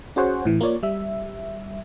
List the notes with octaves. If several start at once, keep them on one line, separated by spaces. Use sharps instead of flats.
C#4 F#4 G#4 C5 C#5 F#5
A2 E3
A#3 F4 C#5 D5
G3 E5